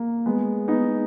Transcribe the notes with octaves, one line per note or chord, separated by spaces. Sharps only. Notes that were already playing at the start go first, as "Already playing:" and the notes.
Already playing: A#3
G#3 B3
B3 D#4